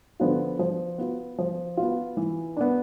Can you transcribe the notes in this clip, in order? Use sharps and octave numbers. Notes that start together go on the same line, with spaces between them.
D3 F3 B3 F4
F3
B3 F4
F3
B3 F4
E3
B3 D4